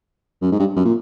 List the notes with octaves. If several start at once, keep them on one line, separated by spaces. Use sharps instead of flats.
F#2
G#2
G2
F#2
A#2